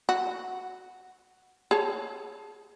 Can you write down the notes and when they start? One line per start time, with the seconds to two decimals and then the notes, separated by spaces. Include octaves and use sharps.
0.09 F#4
1.71 G#4 C#5 A5